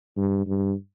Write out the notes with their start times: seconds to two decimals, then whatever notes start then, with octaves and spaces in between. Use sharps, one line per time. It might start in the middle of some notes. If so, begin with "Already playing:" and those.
0.17 G2
0.47 G2